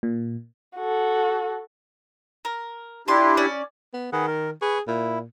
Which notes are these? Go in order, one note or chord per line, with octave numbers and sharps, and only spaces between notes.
A#2
F#4 A4
A#4
D4 E4 F4 G4 C6
C#4 D5
B3
D#3 G#4 B4 F#5
A#4
G#4 B4 C#6
A#2 E4